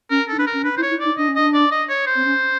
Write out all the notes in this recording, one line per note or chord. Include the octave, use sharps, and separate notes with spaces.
C#4 A#4
D#4 A4
D4 B4
A#4
C#4
D4 B4
E4 C5
C#5
E4
D#4 D5
D4 D#5
C#4
D4 D#5
D5
D#5
C#5
C5
C4
C#4